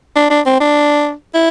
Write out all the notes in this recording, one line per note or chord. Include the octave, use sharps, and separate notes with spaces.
D4
D4
C4
D4
E4